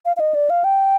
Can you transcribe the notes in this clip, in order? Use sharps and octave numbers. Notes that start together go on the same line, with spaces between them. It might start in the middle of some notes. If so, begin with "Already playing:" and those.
F5
F5
D#5
D5
F5
G5